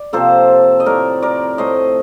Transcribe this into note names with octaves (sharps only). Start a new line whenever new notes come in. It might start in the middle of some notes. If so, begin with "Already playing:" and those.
Already playing: D5
C3 F3 A#3 A4 C5
D#5
A2 A3 A#4 D5
A#4 D5
A2 A3 C5 D#5